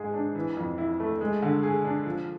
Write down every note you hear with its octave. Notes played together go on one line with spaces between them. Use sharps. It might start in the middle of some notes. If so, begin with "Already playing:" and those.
Already playing: G#2 G#3 G#4
D4
E3
F2
E4
A3
G#3
D3
G#4
D4
F3